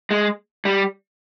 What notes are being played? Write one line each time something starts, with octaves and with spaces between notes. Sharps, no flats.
G#3
G3